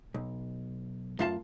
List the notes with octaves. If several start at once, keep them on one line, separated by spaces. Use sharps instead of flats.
B1
F#2 A3 F4 F5 A5